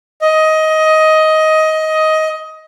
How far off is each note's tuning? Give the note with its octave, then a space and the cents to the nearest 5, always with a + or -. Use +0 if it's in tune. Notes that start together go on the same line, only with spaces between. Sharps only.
D#5 +15